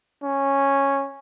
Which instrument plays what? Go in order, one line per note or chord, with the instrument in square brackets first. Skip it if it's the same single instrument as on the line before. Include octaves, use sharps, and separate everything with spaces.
[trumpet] C#4